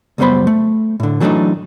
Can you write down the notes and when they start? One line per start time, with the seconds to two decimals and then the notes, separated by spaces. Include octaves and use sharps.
0.18 C#2 F#2 G3 B3 C5 B5
0.47 A3
1.00 A2 D3
1.20 E3 F#3 A3 B3 D4 D#4